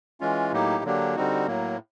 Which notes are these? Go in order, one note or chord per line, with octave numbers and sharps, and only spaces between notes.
E3 G#3 C#4 F4
A2 F#3 A#3 D#4 G4
D3 F#3 A#3 D4 G4
D3 G3 C4 D#4 F#4
A2 F#3 A#3